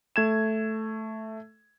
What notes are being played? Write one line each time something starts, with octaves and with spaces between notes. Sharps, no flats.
A3 G#6 E7